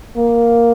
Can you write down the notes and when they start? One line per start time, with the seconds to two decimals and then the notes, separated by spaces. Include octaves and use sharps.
0.16 A#3